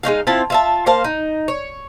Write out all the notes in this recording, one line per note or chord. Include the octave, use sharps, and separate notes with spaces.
G#3 C#4 D#4 F5
C4 E4 F4 A5
F4 E5 A5
A#3 C5 F5 A5
D#4
C#5